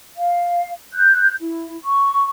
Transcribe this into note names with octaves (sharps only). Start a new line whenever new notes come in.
F5
F#6 G6
E4
C#6